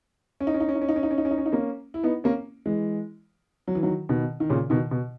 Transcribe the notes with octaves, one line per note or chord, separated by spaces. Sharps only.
C#4
D#4
C#4
D#4
C#4
D#4
C#4
D#4
C#4
D#4
C#4
D#4
C#4
D#4
C#4
D#4
A#3 C#4
E4
B3 D#4
A#3 C#4
E3 G#3
F#3
E3
D#3 F#3
B2 D#3
D#3
A#2 C#3
B2 D#3
B2